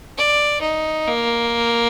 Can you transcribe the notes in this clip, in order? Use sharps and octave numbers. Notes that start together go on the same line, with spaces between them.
D5
D#4
A#3